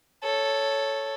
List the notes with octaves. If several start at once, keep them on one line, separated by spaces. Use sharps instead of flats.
A4 C#5